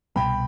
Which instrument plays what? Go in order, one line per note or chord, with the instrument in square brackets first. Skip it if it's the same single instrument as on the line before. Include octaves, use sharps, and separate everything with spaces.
[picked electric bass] C2 B2 G3 B3 [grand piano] G5 B5